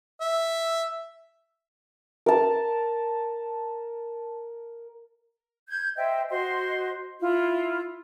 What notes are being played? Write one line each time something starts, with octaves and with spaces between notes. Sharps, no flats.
E5
A#4 A5
G6 G#6
C5 D#5 E5 G5
F#4 C5 D#5 C6
E4 F4